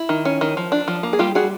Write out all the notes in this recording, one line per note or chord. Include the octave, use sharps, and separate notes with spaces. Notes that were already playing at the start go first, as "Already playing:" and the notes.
Already playing: E4
D#3
C#4
D#3
F3
D4
F3
A#3
G#4
G3 F4 G4
G3 F#4 G#4